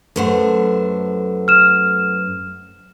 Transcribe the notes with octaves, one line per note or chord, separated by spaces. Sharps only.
F#2 A3 A4 B4 C5 F#5
F6 E7